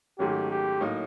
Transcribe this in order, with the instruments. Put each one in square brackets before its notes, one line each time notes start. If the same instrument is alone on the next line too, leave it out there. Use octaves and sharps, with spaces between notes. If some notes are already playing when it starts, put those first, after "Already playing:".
[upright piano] G#2 D#3 F#3 A3 C#4 [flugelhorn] G4
[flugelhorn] G4
[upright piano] A2 F#3 A#3 D#4